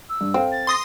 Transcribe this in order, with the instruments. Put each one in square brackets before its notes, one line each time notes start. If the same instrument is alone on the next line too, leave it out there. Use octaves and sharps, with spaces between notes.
[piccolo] E6
[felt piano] G2
[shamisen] C4 [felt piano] A4 F5 G5
[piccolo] A6
[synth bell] C6 D#6 A#6